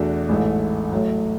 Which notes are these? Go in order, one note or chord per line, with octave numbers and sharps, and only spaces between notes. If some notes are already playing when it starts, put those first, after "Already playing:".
Already playing: E2 B2 A3 D4 F#4
A1 G#2 E3 A3
A2 F#3 A3